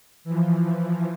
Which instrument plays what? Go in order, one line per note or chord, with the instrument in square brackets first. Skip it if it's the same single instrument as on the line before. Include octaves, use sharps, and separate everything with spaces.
[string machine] E3 F3